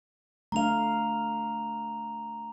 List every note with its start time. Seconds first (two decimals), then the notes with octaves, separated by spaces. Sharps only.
0.52 A3 D4 F5 A#5 F7